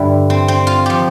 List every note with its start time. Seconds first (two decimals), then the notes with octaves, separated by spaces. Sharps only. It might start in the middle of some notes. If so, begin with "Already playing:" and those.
Already playing: G2 D3 G3 E4
0.30 C4
0.48 C4
0.67 F4
0.86 F3 G4